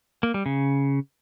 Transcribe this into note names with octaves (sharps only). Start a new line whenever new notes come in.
A#3
G3
C#3